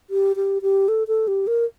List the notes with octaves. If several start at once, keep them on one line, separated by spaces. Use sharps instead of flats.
G4
G4
G4
A4
A4
G4
A#4